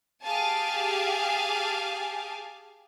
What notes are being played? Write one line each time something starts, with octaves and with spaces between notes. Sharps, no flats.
G4 G#4 F5 G#5 A5